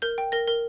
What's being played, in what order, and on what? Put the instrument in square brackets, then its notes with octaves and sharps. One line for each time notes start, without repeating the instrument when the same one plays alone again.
[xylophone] A#4 G6
G5
A#4 A#6
A#4